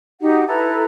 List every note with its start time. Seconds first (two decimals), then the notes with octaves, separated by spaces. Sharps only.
0.21 D#4 F#4 G4 F#5
0.47 E4 A4 B4 A#5